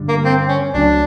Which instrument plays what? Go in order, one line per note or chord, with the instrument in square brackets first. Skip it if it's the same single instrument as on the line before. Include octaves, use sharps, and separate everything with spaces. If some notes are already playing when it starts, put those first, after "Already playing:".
Already playing: [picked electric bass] G2 D3 G3
[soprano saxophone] A#3
C4
C#4
[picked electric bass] C#2 C#3 F#3 A3 [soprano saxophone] D4